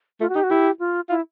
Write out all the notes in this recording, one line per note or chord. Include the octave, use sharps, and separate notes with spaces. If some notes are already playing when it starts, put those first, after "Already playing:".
A3 F4
F#4
D#4 G4
F#4
E4 G4
F4
E4 F4